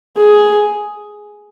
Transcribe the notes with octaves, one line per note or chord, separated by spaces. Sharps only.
G#4